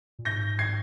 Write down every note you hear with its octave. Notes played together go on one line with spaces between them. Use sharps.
A#2
G#2 G6 A#6
G#6 C7